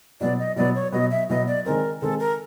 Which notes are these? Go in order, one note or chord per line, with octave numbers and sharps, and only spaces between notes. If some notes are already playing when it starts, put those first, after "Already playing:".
B2 F#3 B3 D5
D#5
B2 F#3 B3 D5
C#5
B2 F#3 B3 D#5
E5
B2 F#3 B3 D#5
D5
D#3 G#3 C4 A#4
D#3 G#3 C4 A4
A#4